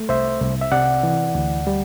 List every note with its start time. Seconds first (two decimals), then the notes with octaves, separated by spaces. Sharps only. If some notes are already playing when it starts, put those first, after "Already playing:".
Already playing: A3
0.09 C2 C5 E5
0.41 C2
0.62 E5
0.72 C3 D5 F#5
1.03 E3
1.35 D2
1.67 G3